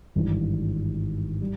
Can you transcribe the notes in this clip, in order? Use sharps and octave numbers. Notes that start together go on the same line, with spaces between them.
G#1 G2 E3
G3